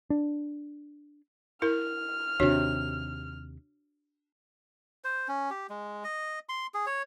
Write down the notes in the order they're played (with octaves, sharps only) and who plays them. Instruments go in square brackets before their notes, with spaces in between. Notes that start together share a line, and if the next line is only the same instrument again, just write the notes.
[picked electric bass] D4
[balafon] E4 A#4 [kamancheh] F6
[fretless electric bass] D#2 C3 [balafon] D4 F#4 C#5
[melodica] C5
C#4
G4
G#3
D#5
C6
G#4
C#5